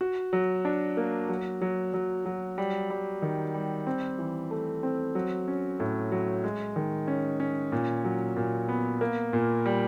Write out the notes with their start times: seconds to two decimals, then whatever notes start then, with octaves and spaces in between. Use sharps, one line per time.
0.01 F#4
0.33 F#3
0.65 D4
0.97 A#3
1.29 F#3
1.62 F#3
1.94 F#3
2.26 F#3
2.58 G3
2.90 G3
3.22 D#3
3.54 G3
3.87 C4
4.19 E3
4.51 A3
4.83 C4
5.15 F#3
5.48 C#4
5.80 A2
6.12 F#3
6.44 G#3
6.76 D#3
7.08 C#4
7.40 C#4
7.72 A#2
8.04 F#3
8.36 A#2
8.68 B3
9.01 A#3
9.33 A#2
9.66 G3